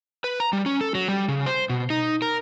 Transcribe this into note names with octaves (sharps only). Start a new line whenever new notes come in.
B4
A#5
G3
C#4
A4
F#3
G3
C#3
C5
B2
D#4
A#4